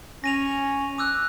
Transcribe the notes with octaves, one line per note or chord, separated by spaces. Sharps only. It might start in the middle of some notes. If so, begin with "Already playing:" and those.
C#4 A#6 D#7 F7
D6 E6 F#6